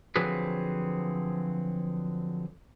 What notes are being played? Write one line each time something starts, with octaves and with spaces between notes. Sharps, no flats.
D3 F3 F#3 C4 G#4 B4